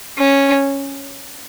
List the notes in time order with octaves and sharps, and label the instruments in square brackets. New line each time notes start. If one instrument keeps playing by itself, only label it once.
[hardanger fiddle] C#4